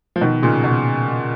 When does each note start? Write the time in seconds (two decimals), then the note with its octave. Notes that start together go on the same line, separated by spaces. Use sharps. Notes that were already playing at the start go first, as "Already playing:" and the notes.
0.16 F3
0.21 B2 D#3
0.42 A#2 C#3
0.64 B2